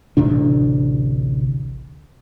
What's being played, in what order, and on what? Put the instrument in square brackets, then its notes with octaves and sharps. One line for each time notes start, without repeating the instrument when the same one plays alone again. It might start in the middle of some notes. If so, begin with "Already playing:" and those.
[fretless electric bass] A1 D2 C3 D4